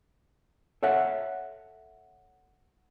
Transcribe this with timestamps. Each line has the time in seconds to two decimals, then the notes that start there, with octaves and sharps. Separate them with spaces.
0.83 A4 C#5 E5 F#5